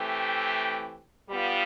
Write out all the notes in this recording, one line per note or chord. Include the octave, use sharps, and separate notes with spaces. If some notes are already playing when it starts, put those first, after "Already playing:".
Already playing: E3 A3 C4 G4
G3 B3 F4